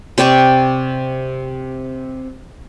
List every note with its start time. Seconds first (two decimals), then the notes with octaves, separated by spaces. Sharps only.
0.18 C3 D5 G5 C#6